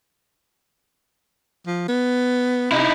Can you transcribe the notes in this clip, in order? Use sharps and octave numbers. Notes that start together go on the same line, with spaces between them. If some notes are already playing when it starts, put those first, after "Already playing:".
F3
B3
C3 D#4 E4